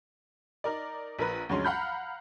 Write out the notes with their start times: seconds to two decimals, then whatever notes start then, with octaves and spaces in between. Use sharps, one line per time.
0.64 D#4 A#4 D5
1.19 A#1 A#4 B4
1.49 D2 G2 F#3 G#3 C#4 C6
1.64 F5 F#5 A#5 B5 F6 G6